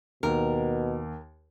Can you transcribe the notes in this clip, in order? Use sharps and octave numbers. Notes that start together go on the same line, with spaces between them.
D#2 B2 A#4